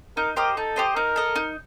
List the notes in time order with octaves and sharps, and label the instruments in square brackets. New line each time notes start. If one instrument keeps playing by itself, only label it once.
[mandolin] D#4 [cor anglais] A#4
[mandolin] G4 C5 D#5 [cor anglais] A#4
[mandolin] D#4 [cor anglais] A4
[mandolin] G4 C5 D#5
[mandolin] D#4 [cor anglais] A#4
[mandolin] A4 D#5
D#4